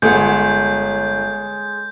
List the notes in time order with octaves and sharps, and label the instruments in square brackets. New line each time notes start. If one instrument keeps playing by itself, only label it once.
[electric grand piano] G1 [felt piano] G#3 [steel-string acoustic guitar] A4 C#5 F#5 [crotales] G6